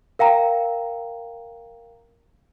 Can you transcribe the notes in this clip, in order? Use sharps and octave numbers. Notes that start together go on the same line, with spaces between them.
A#4 F5 G5 A#5